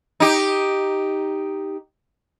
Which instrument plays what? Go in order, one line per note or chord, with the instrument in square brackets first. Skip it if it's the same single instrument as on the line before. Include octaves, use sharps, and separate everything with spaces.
[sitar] D#4 G4